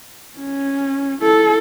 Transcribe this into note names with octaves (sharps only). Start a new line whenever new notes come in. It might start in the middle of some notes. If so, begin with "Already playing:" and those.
C#4
E4 A4